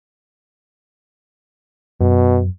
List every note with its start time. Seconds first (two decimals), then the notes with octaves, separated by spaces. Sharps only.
2.01 F#2 B2